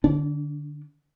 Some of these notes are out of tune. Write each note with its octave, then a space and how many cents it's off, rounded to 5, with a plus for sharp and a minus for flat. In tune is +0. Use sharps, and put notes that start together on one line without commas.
D3 +15 D4 -30